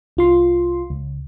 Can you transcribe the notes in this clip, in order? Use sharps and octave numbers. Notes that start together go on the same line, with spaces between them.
C2 F4 C6
C#2